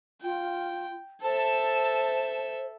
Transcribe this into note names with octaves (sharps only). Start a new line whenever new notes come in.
F4 G5
A4 C5 E5 A5